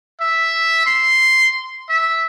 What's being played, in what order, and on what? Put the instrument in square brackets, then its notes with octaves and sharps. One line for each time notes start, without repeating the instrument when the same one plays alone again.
[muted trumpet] E5
C6
E5